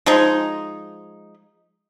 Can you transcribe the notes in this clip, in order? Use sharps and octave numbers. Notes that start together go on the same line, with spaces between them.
F3 G#3 D#4